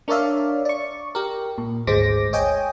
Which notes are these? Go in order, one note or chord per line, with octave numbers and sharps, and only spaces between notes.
D4 A#4 C#5 D5 E5 F5
D5 C#6
G4 A#4
A#2
G#1 D2 G#3 C5 D6 A#6
C#5 D#5 G5 G#5